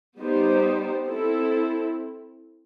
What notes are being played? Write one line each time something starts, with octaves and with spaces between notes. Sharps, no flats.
G3 B3 D#4 G4 C5
C4 E4 A4